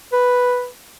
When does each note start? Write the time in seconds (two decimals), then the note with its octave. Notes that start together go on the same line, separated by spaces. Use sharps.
0.13 B4